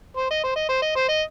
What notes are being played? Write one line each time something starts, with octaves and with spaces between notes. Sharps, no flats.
C5
D#5
C5
D#5
C5
D#5
C5
D#5